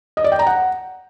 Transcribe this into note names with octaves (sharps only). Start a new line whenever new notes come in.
D#5
D5
G5
A#5
F#5